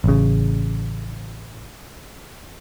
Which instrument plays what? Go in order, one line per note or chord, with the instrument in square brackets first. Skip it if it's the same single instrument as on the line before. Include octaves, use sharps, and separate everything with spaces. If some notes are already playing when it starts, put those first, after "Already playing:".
[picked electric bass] A1 C#3